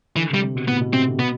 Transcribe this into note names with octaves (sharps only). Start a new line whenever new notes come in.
D3 E3
C3
G3
C3
B2
A2 B3
B2
C3 C4
D3
B2 B3